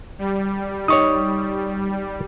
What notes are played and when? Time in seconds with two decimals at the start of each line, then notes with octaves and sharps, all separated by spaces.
0.19 G3
0.88 D#4 C#5 C#6 D#6